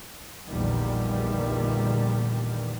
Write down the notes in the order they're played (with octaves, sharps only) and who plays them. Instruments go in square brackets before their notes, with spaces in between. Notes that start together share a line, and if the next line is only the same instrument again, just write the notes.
[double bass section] A#1 E2 A#2 D3 D#3 G3